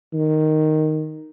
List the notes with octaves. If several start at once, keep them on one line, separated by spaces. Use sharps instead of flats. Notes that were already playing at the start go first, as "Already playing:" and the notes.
D#3